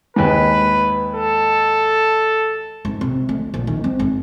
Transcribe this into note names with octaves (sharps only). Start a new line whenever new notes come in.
D#2 G#2 B4
A4
G#1
C3
D2
A#1
D#3
C4
G#1